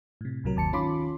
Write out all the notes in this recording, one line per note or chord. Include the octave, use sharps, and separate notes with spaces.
A2 C3
C2 A2 C3 F#3 A#4
G1 D#2 A5 C#7
D#3 C#4 F4 B5 C6 D6